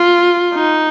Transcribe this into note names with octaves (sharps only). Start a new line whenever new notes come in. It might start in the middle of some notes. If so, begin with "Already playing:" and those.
Already playing: F4
D#4